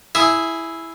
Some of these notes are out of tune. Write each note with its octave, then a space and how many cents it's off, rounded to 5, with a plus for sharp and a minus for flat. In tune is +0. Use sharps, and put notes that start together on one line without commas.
E4 +0 G#4 +5 E5 +0